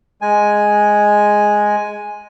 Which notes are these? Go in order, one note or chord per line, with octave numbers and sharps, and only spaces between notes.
G#3 G#5